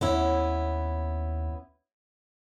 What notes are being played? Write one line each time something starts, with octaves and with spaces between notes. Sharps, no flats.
D#2 B3 C#4 E4